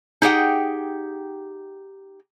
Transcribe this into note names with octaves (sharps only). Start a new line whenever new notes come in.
D#4 G4 G#4 F#5 G5